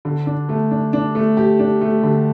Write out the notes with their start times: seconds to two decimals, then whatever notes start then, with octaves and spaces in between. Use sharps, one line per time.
0.05 D3
0.27 D4
0.49 A3
0.71 D4
0.93 D4
1.15 A3
1.37 G4
1.59 D4
1.81 A3
2.03 D3